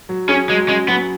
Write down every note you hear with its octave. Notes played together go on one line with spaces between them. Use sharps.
F#3
C#4 G#4
F#3 G#3
G#3 C#4
F#3 B3